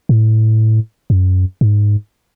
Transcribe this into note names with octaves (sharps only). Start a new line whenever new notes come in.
A2
F#2
G#2